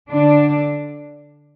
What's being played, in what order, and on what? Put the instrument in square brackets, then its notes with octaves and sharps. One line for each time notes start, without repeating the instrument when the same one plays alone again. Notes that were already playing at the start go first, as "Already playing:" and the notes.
[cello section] D3 D4